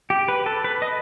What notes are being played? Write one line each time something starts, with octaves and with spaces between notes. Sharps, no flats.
G4
B4
A4
B4
D#5